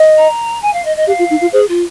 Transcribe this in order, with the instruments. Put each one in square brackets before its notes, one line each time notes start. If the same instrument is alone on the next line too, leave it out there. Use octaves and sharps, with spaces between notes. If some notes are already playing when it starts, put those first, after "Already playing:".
Already playing: [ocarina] D#5
[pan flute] A#5
G#5
F5
D#5
D#5
[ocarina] G4 [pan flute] F5
[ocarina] F4
D#4
F4
[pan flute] G#4 [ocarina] C5
[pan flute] F4